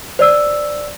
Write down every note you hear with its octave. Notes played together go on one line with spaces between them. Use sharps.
C5 D5 E6